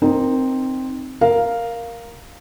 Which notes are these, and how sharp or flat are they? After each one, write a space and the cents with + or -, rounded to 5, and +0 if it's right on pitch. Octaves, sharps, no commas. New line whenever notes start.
C4 +0 D#4 -20 A#4 +5
A#4 +0 F5 +0